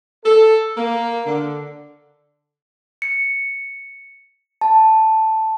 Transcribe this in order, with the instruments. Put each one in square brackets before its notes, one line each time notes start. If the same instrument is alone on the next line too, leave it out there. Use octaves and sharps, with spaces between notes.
[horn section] A4
A#3
D3
[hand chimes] C#7
A5